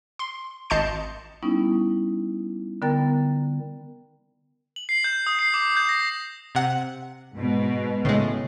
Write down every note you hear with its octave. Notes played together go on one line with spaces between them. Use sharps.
C6
G#1 D#5 A5 C6 G6 C#7
G3 B3 C#4 D#4 E4
D3 B3 A#4 G5 A#5 A6
F#7
C7
G6
D#6
C7
D6
G6
A#6
C3 F#5
G#2 B2
A2 C#3 G#3